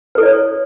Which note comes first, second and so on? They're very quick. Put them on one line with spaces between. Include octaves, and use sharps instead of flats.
B4 A4 E4 D5 C#5